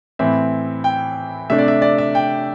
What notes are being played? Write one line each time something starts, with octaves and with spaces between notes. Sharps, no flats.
A2 E3 C4 E5
G5
C3 A3 D4 E5
D5
E5
D5
E5
G5